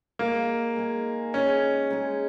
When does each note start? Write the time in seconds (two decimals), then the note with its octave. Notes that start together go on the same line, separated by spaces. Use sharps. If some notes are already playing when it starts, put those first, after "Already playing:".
0.19 G#3 A#3 D#4 G#4
0.76 G#3 D#4 G#4
1.33 G#3 C#4 D#4 G#4
1.90 G#3 D#4 G#4